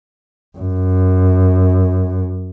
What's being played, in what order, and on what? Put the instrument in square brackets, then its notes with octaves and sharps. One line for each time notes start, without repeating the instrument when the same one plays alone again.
[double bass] F#2